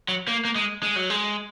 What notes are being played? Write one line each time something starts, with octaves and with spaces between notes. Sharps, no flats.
F#3
A#3
A#3
G#3
G#3
F#3
G#3